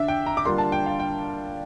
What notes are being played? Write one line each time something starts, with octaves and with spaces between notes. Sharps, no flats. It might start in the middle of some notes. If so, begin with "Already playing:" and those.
Already playing: D3 D4 E5
G5
A#5
D6
D3 G3 A#3 D4 F4 C6
A5
G5
F5
G5